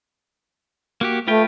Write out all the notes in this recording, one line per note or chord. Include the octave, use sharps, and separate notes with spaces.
A#3 F#4 G4
A3 F4 B4 G5